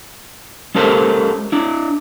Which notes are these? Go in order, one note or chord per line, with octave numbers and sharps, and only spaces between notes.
G#3 C#4 G4 A4 A#4 C5
D4 E4